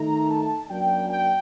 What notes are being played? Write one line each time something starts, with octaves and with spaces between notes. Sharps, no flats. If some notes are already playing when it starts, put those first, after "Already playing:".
Already playing: D#3 A3 D#4 A#5
A5
F#2 F#3 A#3 D4 G5
G5